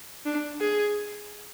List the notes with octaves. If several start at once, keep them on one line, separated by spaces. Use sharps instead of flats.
D4
G#4